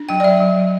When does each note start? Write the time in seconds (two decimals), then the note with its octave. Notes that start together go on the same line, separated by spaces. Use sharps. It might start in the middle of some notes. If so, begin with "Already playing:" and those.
Already playing: D4
0.09 F#3 G5
0.20 D5
0.24 F#3 E5
0.40 F#3
0.56 F#3